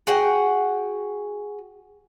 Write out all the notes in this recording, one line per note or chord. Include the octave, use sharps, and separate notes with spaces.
F#4 G#4 F#5 G5